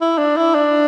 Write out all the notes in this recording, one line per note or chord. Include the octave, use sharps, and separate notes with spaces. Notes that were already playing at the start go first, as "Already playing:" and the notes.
E4
D4
E4
D4